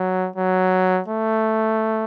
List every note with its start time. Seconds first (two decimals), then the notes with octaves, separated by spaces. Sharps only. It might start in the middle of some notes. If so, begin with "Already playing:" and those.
Already playing: F#3
0.36 F#3
1.08 A3